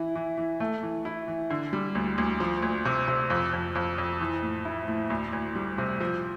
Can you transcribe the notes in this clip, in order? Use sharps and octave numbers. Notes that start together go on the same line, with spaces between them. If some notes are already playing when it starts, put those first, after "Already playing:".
Already playing: E3 E4
E3
E3
A3
E3
E4
E3
D3
G3
D2
D2
F3
D2
C3
C3
F2
F2
F2
F2
E3
A2
E4
A2
D2
D2
G3
C3
F3